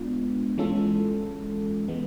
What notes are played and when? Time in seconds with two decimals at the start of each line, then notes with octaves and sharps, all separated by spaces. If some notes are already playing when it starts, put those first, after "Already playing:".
Already playing: G#3 B3 D4 F4
0.58 E3 G#3 C#4 F4 A4
1.88 E3 G#3 B3